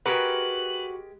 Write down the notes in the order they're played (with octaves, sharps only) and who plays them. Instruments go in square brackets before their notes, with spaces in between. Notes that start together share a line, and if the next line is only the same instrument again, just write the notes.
[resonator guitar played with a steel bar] G#3 G4 A#4 [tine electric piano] F#4 C#7 [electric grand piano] B4 [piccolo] F#7